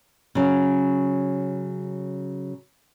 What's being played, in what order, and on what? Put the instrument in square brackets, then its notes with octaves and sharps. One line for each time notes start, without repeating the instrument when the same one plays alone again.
[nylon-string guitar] C#3 F#3